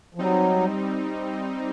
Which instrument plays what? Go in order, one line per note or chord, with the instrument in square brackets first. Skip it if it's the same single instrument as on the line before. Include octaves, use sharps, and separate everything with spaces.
[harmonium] F3
[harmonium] F#3 [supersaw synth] G3 C4 D#4